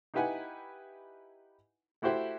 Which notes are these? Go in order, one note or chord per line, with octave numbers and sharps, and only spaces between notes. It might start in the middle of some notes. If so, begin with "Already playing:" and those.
D#4 E4 G4 B4 F#5 G#5
A3 E4 F#4 G4 C5 E5